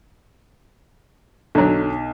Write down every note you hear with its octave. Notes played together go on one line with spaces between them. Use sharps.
B1 D3 F#3